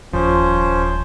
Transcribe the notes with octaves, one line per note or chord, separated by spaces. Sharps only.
D#1 F3 C#4 C5